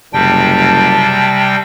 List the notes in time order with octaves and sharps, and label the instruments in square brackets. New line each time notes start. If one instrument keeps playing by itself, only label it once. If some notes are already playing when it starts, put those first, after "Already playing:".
[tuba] F#1 [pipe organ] C3 G3 G5 [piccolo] A5